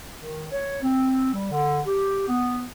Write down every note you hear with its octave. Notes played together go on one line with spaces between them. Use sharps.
D#3
C#5
C4
G3
D3
G4
B3